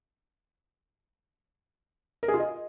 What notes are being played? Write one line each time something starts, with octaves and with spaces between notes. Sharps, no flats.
A#4
G#4
F4
D#5